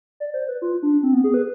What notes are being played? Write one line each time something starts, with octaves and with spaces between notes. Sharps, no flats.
D5
C5
B4
F4
D4
C4
B3
G#4
B4